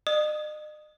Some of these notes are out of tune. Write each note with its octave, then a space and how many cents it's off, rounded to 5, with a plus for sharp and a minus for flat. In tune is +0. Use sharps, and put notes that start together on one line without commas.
D#5 -40 D#6 +0